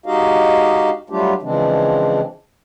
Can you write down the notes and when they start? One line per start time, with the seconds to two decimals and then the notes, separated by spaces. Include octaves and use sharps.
0.06 G#3 D#4 F#4 G4 D#5 F5
1.10 F#3 G3 A3 D4 F4 G4
1.43 C#3 E3 F3 G#3 C4 D4